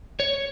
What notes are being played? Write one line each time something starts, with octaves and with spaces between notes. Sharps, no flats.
C#5